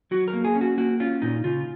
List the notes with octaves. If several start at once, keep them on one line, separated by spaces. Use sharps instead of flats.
F#3 F#4
A#4
A#3
G#4
C#4
F#4
A#3 F#4
C#4 F4
A#2 D#4
C#3 F4